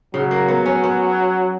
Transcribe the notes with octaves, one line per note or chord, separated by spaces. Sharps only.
C#3 F#3
A#3
B3
C#4
B3